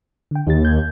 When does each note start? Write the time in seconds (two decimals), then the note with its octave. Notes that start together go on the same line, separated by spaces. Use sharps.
0.31 D3 G5
0.47 D#2 D#4 G4 A6
0.65 G6 G#6